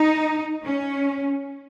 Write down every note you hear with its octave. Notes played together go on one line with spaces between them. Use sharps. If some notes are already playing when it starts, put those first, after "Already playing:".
Already playing: D#4
C#4